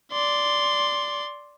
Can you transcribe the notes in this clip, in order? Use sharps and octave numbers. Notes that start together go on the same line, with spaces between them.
D5 C6